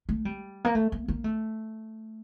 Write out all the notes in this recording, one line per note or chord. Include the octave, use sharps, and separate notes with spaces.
A3
G3
A#3
A3
A#3
A#3
A3